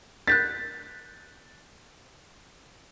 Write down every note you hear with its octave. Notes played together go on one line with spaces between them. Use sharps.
F#6 G6 A6 B6